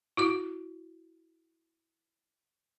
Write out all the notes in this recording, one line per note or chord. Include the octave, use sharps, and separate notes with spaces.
E4 F#4 D6